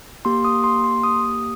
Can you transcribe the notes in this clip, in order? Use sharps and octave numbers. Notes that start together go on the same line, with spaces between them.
A#3 G4 C6
D#6
C6
C6
D#6